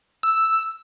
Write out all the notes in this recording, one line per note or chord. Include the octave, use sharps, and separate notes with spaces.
E6